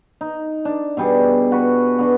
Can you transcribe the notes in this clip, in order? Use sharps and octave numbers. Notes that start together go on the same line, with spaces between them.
D#4
D4
B2 G3 G#4
F#4 B4
B3 D4 F#4